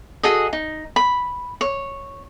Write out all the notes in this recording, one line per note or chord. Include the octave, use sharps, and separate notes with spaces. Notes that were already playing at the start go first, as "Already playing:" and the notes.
F#4 G#4 A4 D#5
D#4
B5
C#5